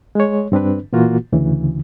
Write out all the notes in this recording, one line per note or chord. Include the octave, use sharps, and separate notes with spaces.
G#3 C#5
G2 C4 D4 B4
A#2 E3 A#3 F4 F#4
D2 C#3 E3